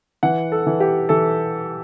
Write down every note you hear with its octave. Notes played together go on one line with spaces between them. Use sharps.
E3 F#5
A4
E3
G4
E3 A4